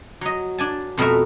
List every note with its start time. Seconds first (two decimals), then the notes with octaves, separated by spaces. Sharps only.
0.21 F#3 D#5
0.58 D4 G#5 A5
0.97 F2 B2 A3 A#4 E5